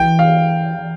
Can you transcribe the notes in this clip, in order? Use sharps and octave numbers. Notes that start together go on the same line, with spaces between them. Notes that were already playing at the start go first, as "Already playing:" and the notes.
Already playing: E3 G5
F5